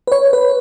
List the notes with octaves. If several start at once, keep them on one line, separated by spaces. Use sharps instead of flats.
B4
C#5
B4